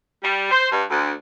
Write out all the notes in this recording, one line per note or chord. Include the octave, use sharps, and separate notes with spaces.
G3
C5
G2
D2